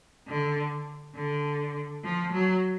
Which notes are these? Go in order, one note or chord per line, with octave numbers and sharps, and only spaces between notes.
D3
D3
F3
F#3